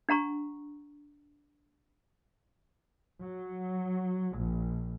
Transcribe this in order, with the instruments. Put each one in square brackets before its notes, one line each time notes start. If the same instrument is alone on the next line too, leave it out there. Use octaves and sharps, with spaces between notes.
[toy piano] D4 F#5 A#5 C#6
[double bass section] F#3
A#1